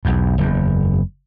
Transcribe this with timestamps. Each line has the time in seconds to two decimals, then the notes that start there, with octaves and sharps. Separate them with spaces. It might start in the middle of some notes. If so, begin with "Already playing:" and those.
0.05 B1 E2
0.38 F#1 E2